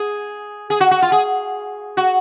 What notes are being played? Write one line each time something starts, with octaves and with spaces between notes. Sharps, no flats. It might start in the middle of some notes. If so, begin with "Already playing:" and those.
Already playing: G#4
G#4
F#4
F#4
F4
G#4
F#4